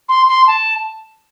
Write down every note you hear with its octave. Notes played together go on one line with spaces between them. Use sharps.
C6
C6
A5